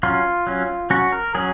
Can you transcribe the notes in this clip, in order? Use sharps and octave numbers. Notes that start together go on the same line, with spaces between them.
F#3 C#4 F4
F#3 C#4
F#3 C#4 F#4
A#4
F#3 C#4 G#4